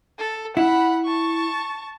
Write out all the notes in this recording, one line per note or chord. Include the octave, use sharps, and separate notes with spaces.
A4
E4 F#5 B5
A5 C#6